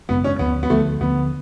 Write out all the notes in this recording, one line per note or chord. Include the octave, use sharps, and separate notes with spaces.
G#1 F#2 C#3 G#3 B3
C#4
D2 D3 F3 B3
B3
D2 D3 F3 A3
D2 D3 F3 B3